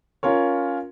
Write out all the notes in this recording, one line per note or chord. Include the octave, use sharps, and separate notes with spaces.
C#4 F4 A#4 C#5